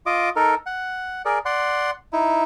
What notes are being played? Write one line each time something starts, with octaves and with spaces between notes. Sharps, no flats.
F4 D#5 D6
D#4 A4 A#4
F#5
G#4 A#4 D5
D5 F#5 C6
D#4 E4